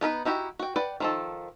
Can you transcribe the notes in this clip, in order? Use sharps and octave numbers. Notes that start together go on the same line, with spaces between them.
B3 D#4 A#4 B4
D#4 E4 F#4 G4
F#4 G5
B4 D5 F#5 G5
D#3 F3 A4